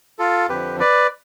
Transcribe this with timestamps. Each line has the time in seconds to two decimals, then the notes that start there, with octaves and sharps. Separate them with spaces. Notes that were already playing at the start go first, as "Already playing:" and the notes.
0.19 F4 A4
0.49 F2 D3 F3 G4 B4
0.80 B4 D5